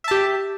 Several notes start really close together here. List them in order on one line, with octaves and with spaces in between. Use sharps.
E5 A5 G4